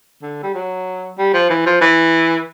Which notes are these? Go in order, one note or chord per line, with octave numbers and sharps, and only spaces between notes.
D3
G3
F#3
G3
F3
E3
F3
E3